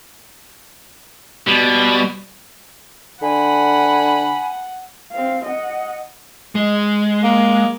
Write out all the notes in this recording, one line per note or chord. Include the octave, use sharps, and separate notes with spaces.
B2 G3
D3 F#5 G#5 B5
C4 F5
D#5 F#5
G#3
A#3